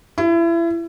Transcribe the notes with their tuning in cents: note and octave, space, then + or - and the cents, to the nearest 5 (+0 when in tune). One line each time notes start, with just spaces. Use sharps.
E4 +30